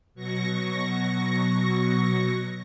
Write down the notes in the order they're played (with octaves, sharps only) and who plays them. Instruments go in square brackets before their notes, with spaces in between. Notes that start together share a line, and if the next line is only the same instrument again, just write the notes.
[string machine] B2 F#3 C#6 A#6